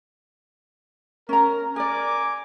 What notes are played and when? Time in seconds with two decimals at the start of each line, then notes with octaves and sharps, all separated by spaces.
1.29 C#4 A#4 A#5
1.76 A#4 D5 G#5 A#5 D6